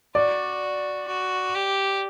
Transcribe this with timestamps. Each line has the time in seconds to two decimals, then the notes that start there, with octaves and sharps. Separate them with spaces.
0.15 F#4 D5
1.08 F#4
1.55 G4